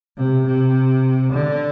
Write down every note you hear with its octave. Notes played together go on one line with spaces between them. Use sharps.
C3
C3
D3